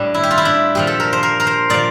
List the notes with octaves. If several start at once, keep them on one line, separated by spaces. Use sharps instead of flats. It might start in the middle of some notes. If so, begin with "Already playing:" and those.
Already playing: A2 G3 D4
E4
G4
F4
E4
D4
A#2 F3 G4
A4
A#4
C5
A#4
A#4
C5
A#2 F3 D5